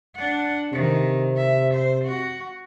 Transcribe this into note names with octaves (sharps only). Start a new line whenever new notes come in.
D4 F#5
C3 D#3
E5
C5
F#4